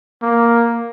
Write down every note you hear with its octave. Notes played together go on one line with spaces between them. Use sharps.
A#3